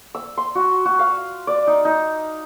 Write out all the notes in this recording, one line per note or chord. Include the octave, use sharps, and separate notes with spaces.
E6
C6
F#4
F#4
F5
D5
D#4
D#4